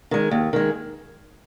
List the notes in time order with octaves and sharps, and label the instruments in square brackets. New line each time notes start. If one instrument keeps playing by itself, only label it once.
[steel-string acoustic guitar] D#3 G#3
D#2
D#3 G#3